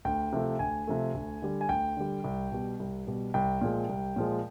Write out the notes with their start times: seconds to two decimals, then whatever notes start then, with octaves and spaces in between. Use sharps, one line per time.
0.05 D2 G5
0.32 C3 F3 A3
0.59 D2 G#5
0.87 C3 F3 A3
1.14 D2
1.42 D3 G3
1.61 G#5
1.69 D2 G5
1.97 D3 G3
2.24 C2
2.52 B2 G3
2.80 C2
3.07 B2 G3
3.34 C2 G5
3.61 A#2 F3 G#3
3.89 C2
4.16 A#2 F3 G#3